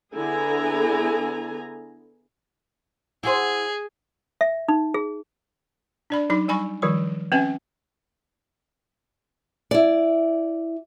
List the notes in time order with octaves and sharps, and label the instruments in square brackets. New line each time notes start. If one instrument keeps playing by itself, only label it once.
[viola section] D3 B3 E4 G#4 G#5 A#5
[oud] E4 F#4 C5 [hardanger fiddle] G#4
[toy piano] E5
D#4
G#4
[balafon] D4 D5 B5
F#3 D#4 B5
G3 G#5 B5 C#6
D#3 F3 G3 C#6
C4 C#4 B4 E5 G#5
[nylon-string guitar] E4 D5